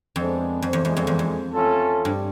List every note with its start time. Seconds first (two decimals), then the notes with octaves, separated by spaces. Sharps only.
0.16 F2 G#3 B3 D4
0.62 F2
0.73 E2
0.85 E2 A#2 F3 G#3
0.97 F2
1.07 E2
1.19 F2
1.53 A3 C#4 F4 A4
2.05 G2